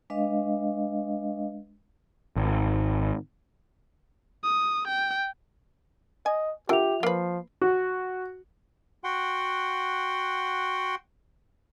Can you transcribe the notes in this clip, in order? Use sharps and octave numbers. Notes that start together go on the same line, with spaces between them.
G#3 D4 B4 D#5 F5
G#1
D#6
G5
D#5 G#5
D3 F4 G4 A#4 E5 F7
F3 A#3 B4 C7
F#4
F#4 F#5 G5 C6